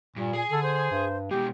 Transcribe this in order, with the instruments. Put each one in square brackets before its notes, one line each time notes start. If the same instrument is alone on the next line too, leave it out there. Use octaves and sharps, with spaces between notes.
[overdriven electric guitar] G2 [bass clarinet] A#2
[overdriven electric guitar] G#4 G#5
[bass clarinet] D3 [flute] A4
[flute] C5
[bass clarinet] G2
[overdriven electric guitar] B2 G#3 [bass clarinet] G4